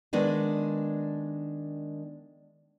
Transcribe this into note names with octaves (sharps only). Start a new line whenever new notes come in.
D#3 G#3 B3 D4 D#4